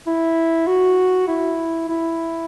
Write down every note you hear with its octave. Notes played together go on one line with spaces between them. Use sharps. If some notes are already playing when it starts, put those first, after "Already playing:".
E4
F#4
E4
E4